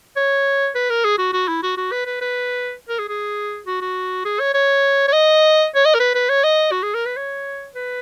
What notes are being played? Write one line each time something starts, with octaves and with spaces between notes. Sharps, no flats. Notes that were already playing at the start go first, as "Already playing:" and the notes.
C#5
B4
A#4
G#4
F#4
F#4
E4
F#4
F#4
B4
B4
B4
A#4
G#4
G#4
F#4
F#4
G#4
C#5
C#5
C#5
D#5
C#5
D#5
A#4
B4
B4
C#5
D#5
F#4
G#4
A#4
B4
C#5
B4